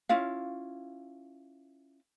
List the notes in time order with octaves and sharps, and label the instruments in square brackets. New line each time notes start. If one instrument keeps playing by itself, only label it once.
[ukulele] C#4 E4 F4 F5